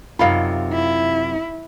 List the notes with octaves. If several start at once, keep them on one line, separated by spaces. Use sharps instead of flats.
F#2 C3 D#4 F4 F5 B5
E4